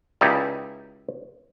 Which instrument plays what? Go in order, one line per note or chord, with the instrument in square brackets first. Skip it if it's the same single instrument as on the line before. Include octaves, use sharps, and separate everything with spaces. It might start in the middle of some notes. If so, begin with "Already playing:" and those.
[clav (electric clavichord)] C#2 D#4 E4 G4 D5